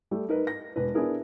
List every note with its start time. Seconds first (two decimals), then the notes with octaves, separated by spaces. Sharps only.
0.11 G3 A3
0.29 D#4 A#4 B4
0.47 A#6
0.76 E1 B4
0.94 B3 D4 E4 G#4 A#4